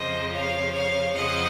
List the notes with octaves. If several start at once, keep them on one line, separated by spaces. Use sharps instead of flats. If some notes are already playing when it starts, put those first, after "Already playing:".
Already playing: F2 C#3 F3 C5 D#5
C#5 F5
C#5 F5
F2 C#3 F3 D#5 F#5